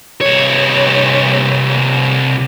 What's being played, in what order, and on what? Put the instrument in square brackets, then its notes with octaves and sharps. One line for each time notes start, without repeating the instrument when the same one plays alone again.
[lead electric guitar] C2 C#5